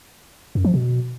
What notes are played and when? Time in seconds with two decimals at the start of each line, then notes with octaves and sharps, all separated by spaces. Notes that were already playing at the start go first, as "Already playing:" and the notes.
0.55 F#2
0.65 F3
0.74 B2